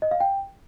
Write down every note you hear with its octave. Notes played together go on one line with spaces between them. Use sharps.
D#5
F5
G5